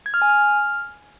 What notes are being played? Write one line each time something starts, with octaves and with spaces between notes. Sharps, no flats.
G#6
F6
G#5
F6